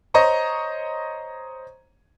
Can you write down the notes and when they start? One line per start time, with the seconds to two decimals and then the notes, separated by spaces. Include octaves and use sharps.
0.14 C5 C#5 D#5 A#5 C#6